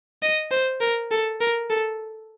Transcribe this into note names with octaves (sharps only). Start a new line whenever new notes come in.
D#5
C5
A#4
A4
A#4
A4